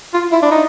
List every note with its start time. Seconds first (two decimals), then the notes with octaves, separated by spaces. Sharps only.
0.14 F4
0.32 E4
0.42 D4
0.51 D#4